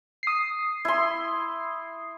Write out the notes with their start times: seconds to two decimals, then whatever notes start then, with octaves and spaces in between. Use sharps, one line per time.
0.23 D#6 C7
0.85 E4 C6